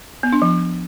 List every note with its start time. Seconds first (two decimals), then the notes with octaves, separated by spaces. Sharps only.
0.23 B3
0.32 D4
0.42 F3